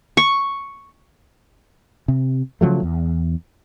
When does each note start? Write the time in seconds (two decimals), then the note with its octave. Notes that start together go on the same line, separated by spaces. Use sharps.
0.17 C#6
2.08 C3
2.61 C#3 F3 F#3 A3
2.83 E2